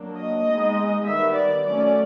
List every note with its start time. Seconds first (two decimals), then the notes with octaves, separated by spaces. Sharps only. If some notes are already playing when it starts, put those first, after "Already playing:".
Already playing: F#3 A#3 D4
0.18 D#5
0.46 G#3 B3 D#4
1.05 D#3 G3 B3 E5
1.35 D5
1.65 F#3 A3 C#4 D5